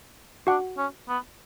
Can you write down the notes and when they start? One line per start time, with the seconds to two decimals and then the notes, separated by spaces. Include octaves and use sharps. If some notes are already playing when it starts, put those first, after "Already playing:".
0.47 D4 F#4 F#5
0.78 C#4
1.09 B3